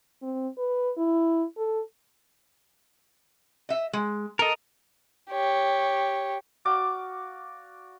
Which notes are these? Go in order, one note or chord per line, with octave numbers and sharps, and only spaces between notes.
C4
B4
E4
A4
D#5 E5
G#3
A4 A#4 D#5
G4 C#5
F#4 D5 F5 D6